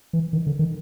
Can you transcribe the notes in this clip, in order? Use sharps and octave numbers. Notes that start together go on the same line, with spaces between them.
E3
D#3
D3
D#3